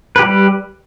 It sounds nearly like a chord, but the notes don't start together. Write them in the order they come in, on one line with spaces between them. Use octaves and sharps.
B4 G4 G3